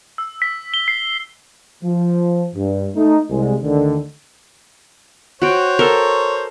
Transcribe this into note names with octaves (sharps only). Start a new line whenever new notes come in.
E6
B6
G7
C7
F3
G2
A3 D#4
C2 G#3
D2 D3 D#3
F#4 C5 C#5 G5
A4 A#4